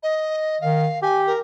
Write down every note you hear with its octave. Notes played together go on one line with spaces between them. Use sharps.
D#5
D#3 F5
G4 G#5
A#4